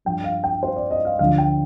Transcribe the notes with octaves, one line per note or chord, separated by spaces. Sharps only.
G2 F3 G5
F5
G5
C5
D5
D#5
F5
D2 D3 F3 F5
G5